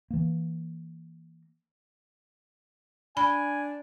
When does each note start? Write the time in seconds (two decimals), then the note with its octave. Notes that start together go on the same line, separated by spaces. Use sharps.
0.11 E3 A#3
3.17 D4 G#5 B5